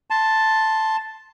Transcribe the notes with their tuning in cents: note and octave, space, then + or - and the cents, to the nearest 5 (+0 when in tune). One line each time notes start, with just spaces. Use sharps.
A5 +0 C6 +0